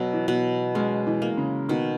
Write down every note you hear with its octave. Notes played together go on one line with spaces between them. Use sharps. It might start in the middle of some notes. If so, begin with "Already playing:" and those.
Already playing: B2 F#3
E3
B2
G#3 C#4
E3
A#3
C#3
B2 D#3